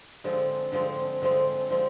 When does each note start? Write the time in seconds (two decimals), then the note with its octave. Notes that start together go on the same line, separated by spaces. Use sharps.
0.24 D3 F3 G#3 C4
0.72 D3 F3 G#3 C4
1.22 D3 F3 G#3 C4
1.70 D3 F3 G#3 C4